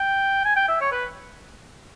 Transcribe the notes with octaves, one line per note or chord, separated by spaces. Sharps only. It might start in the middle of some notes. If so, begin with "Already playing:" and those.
Already playing: G5
G#5
G5
E5
C#5
B4